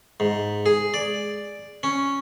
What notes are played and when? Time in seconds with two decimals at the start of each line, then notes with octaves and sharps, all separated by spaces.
0.20 G#2
0.66 G#4
0.94 D5
1.83 C#4